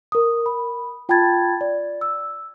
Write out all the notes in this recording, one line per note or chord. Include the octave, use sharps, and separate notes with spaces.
A#4 D#6
B5
F4 G5 A5 B5 G#6 A6
D5
E6